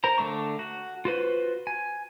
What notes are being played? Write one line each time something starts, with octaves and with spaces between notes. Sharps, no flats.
A#4 C5 A#5
D3 A3 D4 C#6
F#4
F4 F#4 B4 C5
G#5